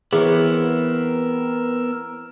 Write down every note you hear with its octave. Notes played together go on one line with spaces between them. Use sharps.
E3 B3 C4 G#4 A#4 C#5 E6